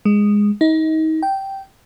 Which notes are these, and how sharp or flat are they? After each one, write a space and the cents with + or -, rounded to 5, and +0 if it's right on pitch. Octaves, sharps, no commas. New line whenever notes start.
G#3 -10
D#4 +30
G5 -10